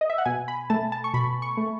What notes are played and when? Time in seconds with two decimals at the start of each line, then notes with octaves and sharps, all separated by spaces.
0.01 D#5
0.10 E5
0.18 F#5
0.25 B2 G#5
0.48 B5
0.70 A3 A5
0.92 A5
1.04 C#6
1.14 B2 B5
1.42 C#6
1.57 A3